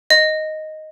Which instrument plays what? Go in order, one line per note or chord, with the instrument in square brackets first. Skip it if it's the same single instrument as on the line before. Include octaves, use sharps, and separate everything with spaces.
[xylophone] D#5